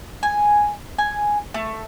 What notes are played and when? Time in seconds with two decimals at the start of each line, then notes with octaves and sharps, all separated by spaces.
0.23 G#5
0.98 G#5
1.54 A3